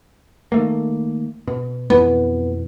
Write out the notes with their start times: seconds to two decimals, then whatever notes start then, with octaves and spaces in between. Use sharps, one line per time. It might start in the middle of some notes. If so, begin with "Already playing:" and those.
0.52 D#3 A3 A#3
1.47 B2
1.90 F2 B2 E3 B3